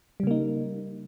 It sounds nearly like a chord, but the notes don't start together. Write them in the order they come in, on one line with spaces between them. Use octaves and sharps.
G3 C#3 A#3 D#4